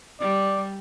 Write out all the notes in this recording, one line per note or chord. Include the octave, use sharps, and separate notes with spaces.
G3 D5